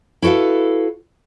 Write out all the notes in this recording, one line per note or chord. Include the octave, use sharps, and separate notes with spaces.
E4 F#4 A4 B4 F5